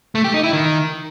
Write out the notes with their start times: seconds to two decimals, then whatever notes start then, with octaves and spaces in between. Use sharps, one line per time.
0.15 A3
0.24 G4
0.34 D#4
0.43 E4
0.53 D#3